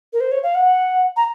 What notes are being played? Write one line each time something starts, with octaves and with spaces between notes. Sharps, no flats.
A#4
C5
C#5
F5
F#5
A#5